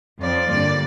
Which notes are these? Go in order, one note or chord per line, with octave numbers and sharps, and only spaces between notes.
F2 F3 C4 F4 D5
G2 D3 A#3 D5